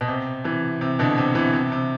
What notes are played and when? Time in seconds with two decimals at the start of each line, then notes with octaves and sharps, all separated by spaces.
0.01 B2
0.08 C3
0.44 C3 E3
0.81 C3
0.99 B2 D3
1.18 C3
1.35 C3 E3
1.53 C3
1.72 C3